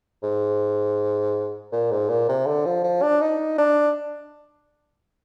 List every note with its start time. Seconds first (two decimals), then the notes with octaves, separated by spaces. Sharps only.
0.23 G#2
1.72 A#2
1.91 G#2
2.09 A#2
2.29 C3
2.47 D3
2.65 F3
2.83 F3
3.02 D4
3.21 D#4
3.58 D4